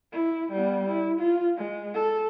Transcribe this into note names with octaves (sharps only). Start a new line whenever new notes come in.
E4
G3 B3
E4
F4
G#3
A4